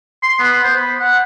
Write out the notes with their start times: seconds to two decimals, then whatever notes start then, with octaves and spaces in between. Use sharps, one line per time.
0.23 C6
0.40 B3
0.64 C5
0.77 B5
1.00 F#5